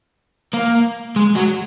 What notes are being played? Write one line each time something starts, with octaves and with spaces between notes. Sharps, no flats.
A#3
G#3
F#3